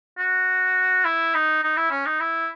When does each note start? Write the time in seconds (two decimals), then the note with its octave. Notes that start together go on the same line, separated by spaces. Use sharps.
0.18 F#4
1.05 E4
1.34 D#4
1.63 D#4
1.77 E4
1.91 C#4
2.06 D#4
2.20 E4